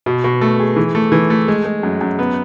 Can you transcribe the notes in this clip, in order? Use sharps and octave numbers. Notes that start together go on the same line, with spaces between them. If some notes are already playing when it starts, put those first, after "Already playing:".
B2
B2
A3
G#4
E3
A3
E3
A3
G#3
G#3
F#2
F#2
B3